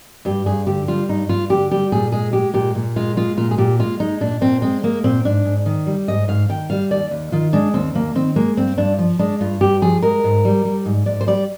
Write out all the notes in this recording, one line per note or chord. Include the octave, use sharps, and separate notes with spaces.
G2 G4
G2 G#4
D3 G4
G3 F4
G2 D#4
G2 F4
D3 G4
G3 G4
A#2 G#4
G#3 G#4
G#3 G4
A#2 G4
A#2
G#3 F4
G#3 F4
A#2 F4
G#4
A#2 G4
G#3 F4
G#3 D#4
A#2 D4
A#2 C4
G#3 C4
G#3 A#3
A#2 C4
G#2 D4
G#2
D#3
G3
G#2 D#5
G#2 F5
D#3 G5
G3 F5
D#2 D5
D#2
D#3 F4
G#3 D4
D#2 C4
D#2 A#3
D#3 C4
G#3 A#3
G2 C4
G2 D4
F3
G#3 D4
G2 F4
G2 G4
F3 G#4
G#3 A#4
G#2
G3
G3
G#2
G#2 D5
C5
G3 D5